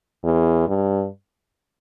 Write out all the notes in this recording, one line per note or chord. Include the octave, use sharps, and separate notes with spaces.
E2
G2